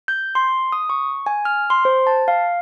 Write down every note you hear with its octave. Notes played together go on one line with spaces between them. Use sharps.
G6
C6
D#6
C#6
G#5
F6
C6
C5
A5
F5